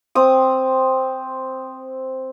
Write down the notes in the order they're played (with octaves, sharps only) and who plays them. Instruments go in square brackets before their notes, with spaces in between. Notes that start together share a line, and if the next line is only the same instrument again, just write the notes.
[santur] C4 D#6